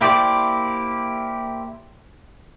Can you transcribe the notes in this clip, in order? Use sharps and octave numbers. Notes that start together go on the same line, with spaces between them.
A#3 E4 G4 C5 D5